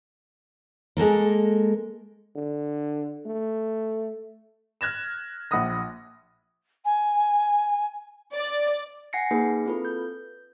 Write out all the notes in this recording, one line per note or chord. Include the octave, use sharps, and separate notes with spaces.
G#3 A#3 A4 A#4
D3
A3
F6 F#6 G#6 A#6 E7
A#1 F#5 B5 D#6 A#6
G#5
D5
F#5 G#5 A#6 C7 C#7
A#3 D#4 G#4 B4
C4 E4 F4 A4 B4
G6